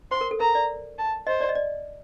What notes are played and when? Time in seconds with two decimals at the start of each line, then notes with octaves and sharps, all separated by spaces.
0.11 C5 C6
0.21 A#4
0.31 A4
0.40 A#4 A#5
0.55 D5
0.98 A5
1.27 C5 D#5
1.41 D5
1.49 D#5
1.55 D5